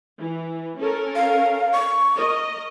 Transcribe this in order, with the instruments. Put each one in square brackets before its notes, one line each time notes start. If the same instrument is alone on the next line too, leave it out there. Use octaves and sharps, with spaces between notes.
[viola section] E3
C#4 A4 A#4
[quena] F5
C#6
[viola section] A#4 D#5